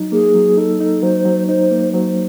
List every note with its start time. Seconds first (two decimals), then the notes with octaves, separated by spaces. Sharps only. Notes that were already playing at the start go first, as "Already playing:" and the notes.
Already playing: F#3 D#4
0.12 A#3 G#4
0.35 F#3
0.57 D#4 A4
0.80 D#4
1.02 F#3 C5
1.26 F#3
1.47 D#4 C5
1.71 A#3
1.93 F#3 C5